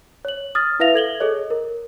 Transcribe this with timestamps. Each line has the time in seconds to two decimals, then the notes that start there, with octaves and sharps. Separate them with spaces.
0.25 C#5 F#7
0.55 D#6 F6 A6
0.80 E4 B4 E5 F5 A#6 F7
0.94 A4 G#6 F#7 G7
1.20 G#4 A4 C#5 D#5
1.50 A#4